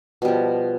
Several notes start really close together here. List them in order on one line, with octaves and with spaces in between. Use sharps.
B2 G3 F3